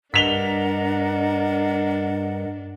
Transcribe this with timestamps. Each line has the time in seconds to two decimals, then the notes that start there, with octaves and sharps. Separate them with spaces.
0.14 G2 D4 A#4 D#5 F#5 B6 F7 G7